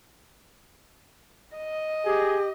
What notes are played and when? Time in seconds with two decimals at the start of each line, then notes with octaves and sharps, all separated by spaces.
1.56 D#5
2.05 G4 G#4